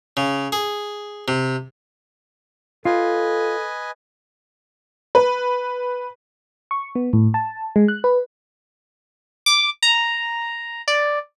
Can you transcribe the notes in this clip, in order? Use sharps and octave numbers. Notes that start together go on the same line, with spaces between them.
C#3
G#4
C3
F4 A4 B4 D#5 G#5
B4
C#6
B3
A2
A5
G#3
F#6
B4
D6
A#5
D5